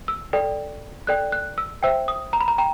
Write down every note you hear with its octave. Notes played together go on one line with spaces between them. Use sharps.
E6
A4 D5 G5
A4 D5 G5 F#6
F#6
E6
C5 E5 G5 E6
D#6
A#5
B5
A#5
G5 A#5